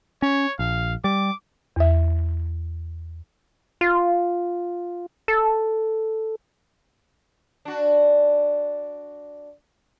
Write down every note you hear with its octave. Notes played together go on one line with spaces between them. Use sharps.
C#4 C#5
A#1 F5
G3 D6
E2 E5
F4
A4
D4 F#4